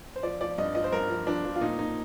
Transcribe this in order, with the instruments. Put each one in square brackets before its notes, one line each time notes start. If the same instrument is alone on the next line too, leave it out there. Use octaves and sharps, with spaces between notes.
[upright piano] C5
F3 D5
F3 D5
G2 D#5
F3 D#5
C5
G2 A#4
F3
F3 D4
F3
F4
A#2 D#4
A#2 D#4